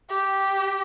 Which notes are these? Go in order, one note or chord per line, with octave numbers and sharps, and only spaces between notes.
G4